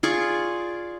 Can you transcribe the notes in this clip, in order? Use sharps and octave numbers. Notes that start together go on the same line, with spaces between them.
F4 G#4 D5 C#6